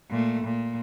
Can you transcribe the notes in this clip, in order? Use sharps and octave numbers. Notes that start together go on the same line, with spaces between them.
A#2 A3
A#2